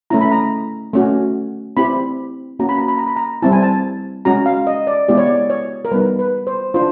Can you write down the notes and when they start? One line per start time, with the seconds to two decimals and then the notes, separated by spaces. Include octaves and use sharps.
0.10 A3 C#4 E4 A#5
0.21 B5
0.32 A#5
0.93 A3 C#4 F#4
1.77 C4 E4 G4 B5
2.59 A#3 C#4 F#4 A#5
2.69 B5
2.78 A#5
2.88 B5
2.98 A#5
3.07 B5
3.16 A#5
3.42 G3 C4 E4 A5
3.52 G#5
3.62 A5
4.25 G#3 C#4 F#4 A#5
4.46 F5
4.67 D#5
4.87 D5
5.08 G#3 B3 E4 G4 D5
5.17 C#5
5.26 D5
5.50 C#5
5.85 A#4
5.91 G3 B3 D#4 B4
6.19 B4
6.47 C5
6.74 D4 F4 C5